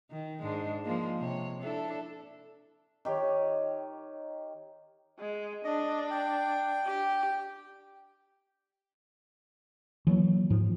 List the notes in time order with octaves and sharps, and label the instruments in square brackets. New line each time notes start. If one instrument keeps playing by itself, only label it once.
[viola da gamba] D#3
G#2 G#3 D4
F3 G#3 A#3
C3 C#5
D4 E4 A4
[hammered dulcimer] D#3 G4 C#5
[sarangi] G#3
[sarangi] D4 [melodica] D#5
[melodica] G5
[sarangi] G4
[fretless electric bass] E3 F#3 A3 A#3
G#2 F3